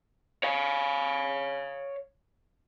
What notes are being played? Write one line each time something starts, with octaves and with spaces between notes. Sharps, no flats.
C#5 F5